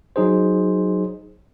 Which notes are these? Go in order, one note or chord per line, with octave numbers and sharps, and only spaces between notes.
F#3 D#4 G#4 C5